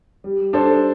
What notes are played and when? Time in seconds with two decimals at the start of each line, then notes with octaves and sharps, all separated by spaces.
0.24 G3
0.53 D4 A4 C5